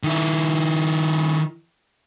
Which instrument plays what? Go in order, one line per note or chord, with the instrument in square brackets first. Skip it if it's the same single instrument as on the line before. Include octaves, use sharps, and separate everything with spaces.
[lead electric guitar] D#3 E4